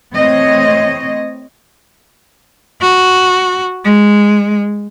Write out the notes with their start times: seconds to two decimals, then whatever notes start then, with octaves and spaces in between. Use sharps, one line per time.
0.13 E3 A3 C4 C#5 D#5
2.81 F#4
3.85 G#3